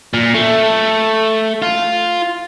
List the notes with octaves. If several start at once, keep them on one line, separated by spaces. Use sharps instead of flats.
A#2
A3
F4